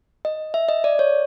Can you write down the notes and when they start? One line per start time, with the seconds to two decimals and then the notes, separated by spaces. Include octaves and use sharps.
0.25 D#5
0.54 E5
0.69 D#5
0.84 D5
0.99 C#5